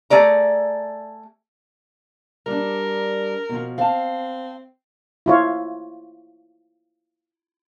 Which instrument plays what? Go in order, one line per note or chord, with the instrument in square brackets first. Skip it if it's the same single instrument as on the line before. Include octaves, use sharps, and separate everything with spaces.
[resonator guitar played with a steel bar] A3 G#4 D5 A#5
[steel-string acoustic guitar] G3 D4 [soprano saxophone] A#4
[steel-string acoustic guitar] B2 F3
[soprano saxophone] C4 [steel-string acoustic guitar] F5 A5
[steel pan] E4 F4 C#5